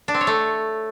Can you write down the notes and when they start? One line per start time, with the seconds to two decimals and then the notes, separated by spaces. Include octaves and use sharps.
0.08 D4
0.14 C4
0.21 C#5
0.27 A3